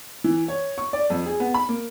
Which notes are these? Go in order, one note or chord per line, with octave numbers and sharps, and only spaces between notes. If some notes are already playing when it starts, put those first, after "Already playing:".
E3
C#5
C#6
D5
F2
G#4
B3
B5
A#3